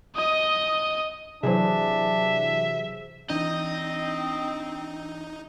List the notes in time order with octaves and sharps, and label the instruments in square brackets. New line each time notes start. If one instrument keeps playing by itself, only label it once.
[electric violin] D#5 D#6
[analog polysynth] C3 E3 F#3 [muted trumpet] D4 [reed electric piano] G#4 C5 [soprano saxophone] E5
[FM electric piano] E3 D4 G6 [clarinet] C4 [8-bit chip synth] D#4 [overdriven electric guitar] D#5